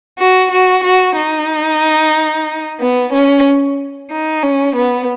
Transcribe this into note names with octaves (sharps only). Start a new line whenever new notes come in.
F#4
F#4
F#4
D#4
B3
C#4
D#4
C#4
B3